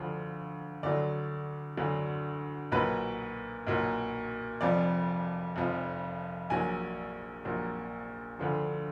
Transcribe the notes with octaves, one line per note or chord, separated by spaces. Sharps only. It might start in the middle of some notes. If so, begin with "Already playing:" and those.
Already playing: D2 D3 F3
D2 D3 F#3 D5
D2 D3 F#3
B1 A#2 F#3 B4
B1 A#2 F#3
F1 F2 F3 D5
F1 F2 F3
A#1 A#2 F#3 G#5
A#1 A#2 F#3
D2 D3 F3